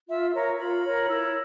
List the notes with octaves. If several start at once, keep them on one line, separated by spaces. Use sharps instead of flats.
F4 E5
A#4 C#5 A#5
F4 B5
A#4 C#5
E4